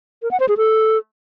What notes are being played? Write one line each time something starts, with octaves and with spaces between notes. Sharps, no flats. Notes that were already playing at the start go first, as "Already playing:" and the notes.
A#4
F#5
C5
G#4
A4